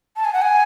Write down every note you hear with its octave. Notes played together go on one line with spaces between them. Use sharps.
A5
G#5
F#5
G#5